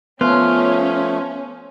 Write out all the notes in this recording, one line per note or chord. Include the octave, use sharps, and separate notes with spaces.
F3 A3 B3 C#4 F4